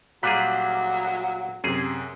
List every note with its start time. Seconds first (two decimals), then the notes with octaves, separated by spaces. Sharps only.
0.23 A#2 F#3 G3 G#4 F#6 B6
1.64 F#2 C3 G#4